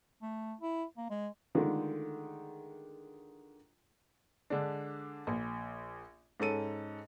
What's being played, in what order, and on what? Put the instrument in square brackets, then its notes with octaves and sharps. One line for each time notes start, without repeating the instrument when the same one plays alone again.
[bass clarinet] A3
E4
A#3
G#3
[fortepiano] D3 D#3 G#3 A3 D4 F4
[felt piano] D3 G#3 D4
A#1
G#2 C#4 A4 D#7